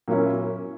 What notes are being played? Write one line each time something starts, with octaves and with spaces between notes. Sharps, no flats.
A#2 F#3 A#3 C#4 E4